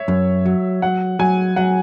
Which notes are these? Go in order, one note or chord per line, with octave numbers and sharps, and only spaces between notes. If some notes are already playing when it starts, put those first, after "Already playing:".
Already playing: C#5 E5
F#2
F#3
F#3 F#5
F#3 G#5
F#3 F#5